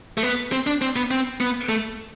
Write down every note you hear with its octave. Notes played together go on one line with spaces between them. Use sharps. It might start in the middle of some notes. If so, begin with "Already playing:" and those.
A3
B3
C4
D4
C4
B3
C4
B3
A3